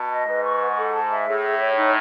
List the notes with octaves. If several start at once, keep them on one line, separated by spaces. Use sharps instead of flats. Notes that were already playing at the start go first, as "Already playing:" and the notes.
Already playing: B2 A5
D#5
G#2 B4
C#6
F#5
A4
A5
E5
A2 G#4
E5
C#5
D#4